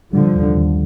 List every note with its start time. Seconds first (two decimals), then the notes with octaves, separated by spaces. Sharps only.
0.13 D3 F3 G3
0.35 D#2
0.58 D#2